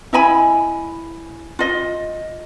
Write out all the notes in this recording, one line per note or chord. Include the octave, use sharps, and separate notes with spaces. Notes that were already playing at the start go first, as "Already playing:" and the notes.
E4 D#5 G#5 B5
F4 D#5